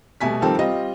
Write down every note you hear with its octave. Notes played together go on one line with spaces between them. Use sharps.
B2 G3 A3 G#5 B6
D#3 F3 G3 C4 A4
G3 C4 F4 D#5